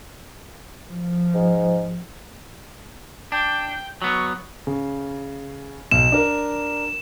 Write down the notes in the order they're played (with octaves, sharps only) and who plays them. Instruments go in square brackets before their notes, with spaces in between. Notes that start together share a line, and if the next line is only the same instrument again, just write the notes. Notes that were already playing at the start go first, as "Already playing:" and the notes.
[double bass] F3
[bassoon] G#2
[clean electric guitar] D4 [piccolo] G5
[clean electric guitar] F#3 B3 [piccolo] C#6
[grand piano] C#3
[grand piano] B1 [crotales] E7
[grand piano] D4 A#4